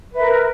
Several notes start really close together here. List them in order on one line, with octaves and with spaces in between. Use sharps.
B4 E5 A#4